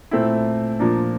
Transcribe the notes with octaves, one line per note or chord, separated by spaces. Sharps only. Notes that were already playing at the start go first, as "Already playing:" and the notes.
A#2 A3 C4 E4
A#2 F3 A#3 D4